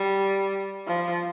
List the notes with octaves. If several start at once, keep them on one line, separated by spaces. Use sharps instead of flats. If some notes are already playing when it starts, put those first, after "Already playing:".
Already playing: G3
F3